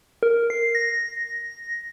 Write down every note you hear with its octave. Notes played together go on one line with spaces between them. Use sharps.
A#4
C7
A#6